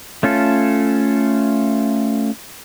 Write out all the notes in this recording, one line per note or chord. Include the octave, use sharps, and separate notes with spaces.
A3 C#4 F4 A4